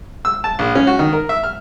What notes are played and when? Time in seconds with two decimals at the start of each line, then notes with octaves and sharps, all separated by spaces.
0.25 E6
0.44 A5
0.59 A#1
0.75 C#4
0.87 F#4
0.99 D#3
1.13 A#4
1.29 E5
1.43 F6